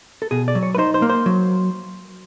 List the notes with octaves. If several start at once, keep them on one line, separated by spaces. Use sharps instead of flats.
A4
B2 G#4
D5
F#3
C#5
B4
D#4 C5
C5
A#3
C5
F#3